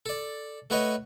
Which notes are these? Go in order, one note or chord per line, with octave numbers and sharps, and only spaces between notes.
A4 D5
A3 F#4 B4 C#5 D#5